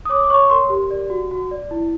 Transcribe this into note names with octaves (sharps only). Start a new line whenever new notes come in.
D#6
C#5 D6
D6
C#5 C#6
A#4 C6
G4
D5
F#4
F#4
D5
E4